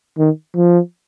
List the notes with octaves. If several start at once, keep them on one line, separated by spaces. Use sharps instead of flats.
D#3
F3